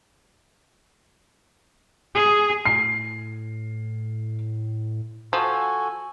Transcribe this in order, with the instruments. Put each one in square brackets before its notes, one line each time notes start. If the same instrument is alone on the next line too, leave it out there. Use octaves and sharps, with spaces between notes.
[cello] G#4
[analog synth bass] A2 [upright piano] C7
[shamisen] F3 [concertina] F#4 A4 G#5